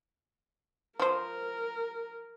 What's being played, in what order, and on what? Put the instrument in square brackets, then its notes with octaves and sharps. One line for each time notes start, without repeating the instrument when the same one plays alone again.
[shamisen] F3 C5 [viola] A#4